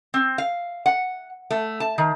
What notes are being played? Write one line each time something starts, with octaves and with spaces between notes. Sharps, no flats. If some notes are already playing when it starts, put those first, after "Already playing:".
C4
F5
F#5
A3
A5
D#3